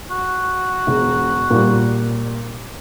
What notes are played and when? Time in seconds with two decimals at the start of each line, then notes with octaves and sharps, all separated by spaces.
0.11 F#4
0.87 E1
1.50 A#2 G3